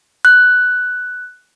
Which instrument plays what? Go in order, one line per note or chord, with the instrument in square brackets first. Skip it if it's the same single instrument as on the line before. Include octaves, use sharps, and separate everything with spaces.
[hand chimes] F#6